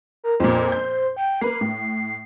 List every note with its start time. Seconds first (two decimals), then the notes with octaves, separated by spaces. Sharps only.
0.24 A#4
0.40 F2 A#2 C5
0.72 G6
1.17 G5
1.41 A#3 B4 C7
1.61 A2